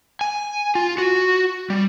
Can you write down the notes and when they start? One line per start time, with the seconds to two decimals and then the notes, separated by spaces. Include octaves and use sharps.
0.21 G#5
0.75 F4
0.98 F#4
1.70 G3